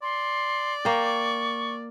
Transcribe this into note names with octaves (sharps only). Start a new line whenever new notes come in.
D5 C6
A#3 G5 C#6